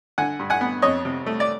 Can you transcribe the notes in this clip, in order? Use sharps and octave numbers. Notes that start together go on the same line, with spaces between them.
D3 F#5 G#5
G2
F#5 G#5
B3
F2 C#5 D#5
C3
A3
D5